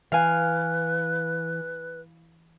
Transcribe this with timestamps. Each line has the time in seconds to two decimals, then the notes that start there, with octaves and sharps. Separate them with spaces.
0.12 E3 B4 F5 G#5